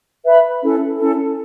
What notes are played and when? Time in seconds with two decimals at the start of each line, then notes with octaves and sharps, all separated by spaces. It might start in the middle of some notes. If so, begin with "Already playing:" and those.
0.25 B4 E5 B5
0.62 C#4 E4 A4
0.98 C#4 E4 A4